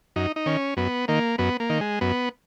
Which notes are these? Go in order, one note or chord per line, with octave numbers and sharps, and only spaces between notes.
F#2 D#4
D#4
D#3 C#4
F#2 B3
D#3 A#3
F#2 B3
A#3
D#3
G#3
F#2 B3